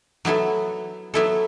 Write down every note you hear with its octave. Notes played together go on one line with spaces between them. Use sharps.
F#3 B3 E4 A4
F#3 B3 E4 A4